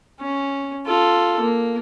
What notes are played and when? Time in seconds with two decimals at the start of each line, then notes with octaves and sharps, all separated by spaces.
0.20 C#4
0.86 F4 A4
1.40 A#3